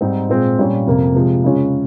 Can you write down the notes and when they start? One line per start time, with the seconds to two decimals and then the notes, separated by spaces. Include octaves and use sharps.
0.01 G#2 G3 C4 D#4
0.29 A#2 G#3 C4
0.59 A#2 G3 C#4 F4
0.87 F2 C3 F3 A#3
1.15 C3 F3 G#3
1.44 C#3 G#3 C#4 F4